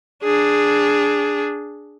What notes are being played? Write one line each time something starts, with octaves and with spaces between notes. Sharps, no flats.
D4 G#4